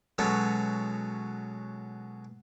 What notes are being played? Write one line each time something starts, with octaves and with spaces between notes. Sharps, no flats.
B2 F#3 G#3 B3 C#4 A4